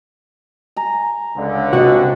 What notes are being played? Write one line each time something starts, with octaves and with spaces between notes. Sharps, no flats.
G#5 A#5
C#2 D3
C3 F#4 G4 D5 D#5